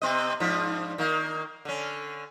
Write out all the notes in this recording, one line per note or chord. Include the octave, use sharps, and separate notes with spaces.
C3 B3 D#5
G#2 F3 D4
D#3 A#3
D3 C#4